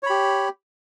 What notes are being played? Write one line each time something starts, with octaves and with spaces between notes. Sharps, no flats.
G4 C#5 B5